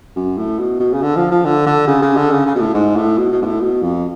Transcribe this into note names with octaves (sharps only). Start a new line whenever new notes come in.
F#2
A2
B2
B2
C#3
D3
F3
F3
D3
D3
C#3
C#3
D3
C#3
C#3
B2
A2
G#2
A2
B2
B2
G#2
A2
B2
F2